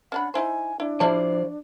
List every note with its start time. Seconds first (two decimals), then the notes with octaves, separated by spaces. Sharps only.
0.12 C#4 D4 F#5 B5
0.34 D#4 E4 C5 G#5
0.80 D4 E4
1.00 F3 G3 E4 C5 D5 A5